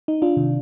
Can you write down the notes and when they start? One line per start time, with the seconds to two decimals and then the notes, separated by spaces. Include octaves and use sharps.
0.08 D#4
0.22 D4 F4
0.37 C3 D#3